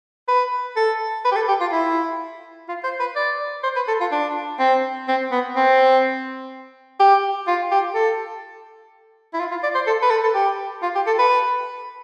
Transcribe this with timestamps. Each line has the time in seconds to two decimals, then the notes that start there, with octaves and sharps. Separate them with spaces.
0.28 B4
0.76 A4
1.25 B4
1.32 G4
1.36 A4
1.48 G4
1.60 F4
1.72 E4
2.69 F4
2.84 C5
3.00 B4
3.16 D5
3.64 C5
3.76 B4
3.88 A4
4.00 F4
4.12 D4
4.59 C4
5.08 C4
5.32 B3
5.56 C4
7.00 G4
7.48 F4
7.72 G4
7.95 A4
9.34 E4
9.40 F4
9.51 F4
9.63 D5
9.75 C5
9.87 A4
10.03 B4
10.11 A4
10.23 A4
10.34 G4
10.83 F4
10.95 G4
11.07 A4
11.19 B4